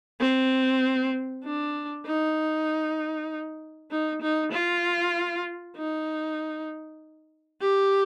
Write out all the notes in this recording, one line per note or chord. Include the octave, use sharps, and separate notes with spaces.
C4
D4
D#4
D#4
D#4
F4
D#4
G4